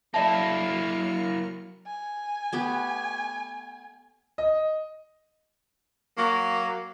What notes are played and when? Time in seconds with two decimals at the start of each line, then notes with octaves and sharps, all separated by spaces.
0.14 F#3 A#3 E4 D5 E5 A5 F6 C#7
1.87 G#5
2.53 A3 B3 G4
4.38 D#5
6.18 F#3 A#3